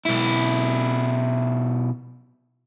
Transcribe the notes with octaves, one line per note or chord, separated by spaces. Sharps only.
B1 E4